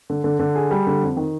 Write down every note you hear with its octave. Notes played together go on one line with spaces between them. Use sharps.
D3
D3
D3
G#4
G3
D3
F2
D#3